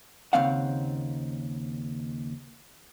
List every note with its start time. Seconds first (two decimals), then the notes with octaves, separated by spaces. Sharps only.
0.33 D#2 C#3 C4 F5 F#5